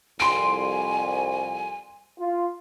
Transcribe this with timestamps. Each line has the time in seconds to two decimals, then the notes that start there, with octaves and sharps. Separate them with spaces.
0.20 C2 F2 G#5 C6 D7
2.20 F4